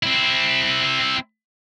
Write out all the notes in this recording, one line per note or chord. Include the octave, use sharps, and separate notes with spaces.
C4 E4